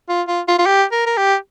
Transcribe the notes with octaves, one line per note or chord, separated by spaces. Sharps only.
F4
F4
F4
F4
G4
A#4
A#4
G4